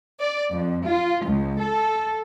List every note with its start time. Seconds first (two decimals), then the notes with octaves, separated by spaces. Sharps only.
0.20 D5
0.51 F2
0.86 F4
1.25 C#2
1.59 A4